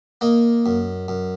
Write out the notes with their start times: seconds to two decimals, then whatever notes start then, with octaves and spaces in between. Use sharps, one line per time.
0.21 A#3 D#5
0.66 F#2
1.08 F#2